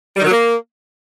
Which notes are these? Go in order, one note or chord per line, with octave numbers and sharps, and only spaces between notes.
G3
D#3
F#3
A#3